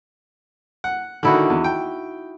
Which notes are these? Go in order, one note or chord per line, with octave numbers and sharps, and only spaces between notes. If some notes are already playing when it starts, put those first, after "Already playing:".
F#5
D3 D#3 D#4 E4 F#4
E2
G5